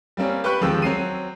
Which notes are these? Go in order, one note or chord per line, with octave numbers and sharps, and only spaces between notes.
G3 A#3 C4 C#4
G4 B4 G5 B5 C#6 F#6
D#2 F3 G#3 C4 E6
F#3 C4 C7 D#7